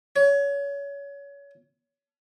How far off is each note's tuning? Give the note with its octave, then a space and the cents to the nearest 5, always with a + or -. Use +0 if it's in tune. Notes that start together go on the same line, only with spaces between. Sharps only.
C#5 +25